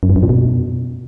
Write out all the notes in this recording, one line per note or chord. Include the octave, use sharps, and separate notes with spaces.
F#2
G2
F#2
A#2
B2